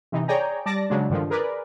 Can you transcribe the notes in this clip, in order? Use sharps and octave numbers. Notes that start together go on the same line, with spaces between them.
C3 E3 D#4
G#4 C#5 D5 G5 G#5 A#5
G3 D5 A5 D6 A#6
C#3 F#3 G#3 D4
G2 D3 D#3 F3
G#4 A#4 B4 D5